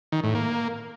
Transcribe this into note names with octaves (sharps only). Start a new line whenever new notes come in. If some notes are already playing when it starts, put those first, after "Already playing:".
D#3
A2
A#3